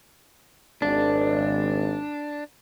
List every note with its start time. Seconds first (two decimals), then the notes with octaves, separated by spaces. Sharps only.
0.82 G#1 D4